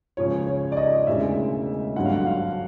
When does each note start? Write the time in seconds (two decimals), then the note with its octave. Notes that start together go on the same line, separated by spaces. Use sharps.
0.17 C#2 C#3 F3 C#5
0.47 C#5
0.72 D5
0.77 D#5
1.07 E1 D2 C#3 E3 G#3 E5
1.96 G#1 G2 D3 F#3 F#5
2.05 F5
2.13 F#5
2.26 F5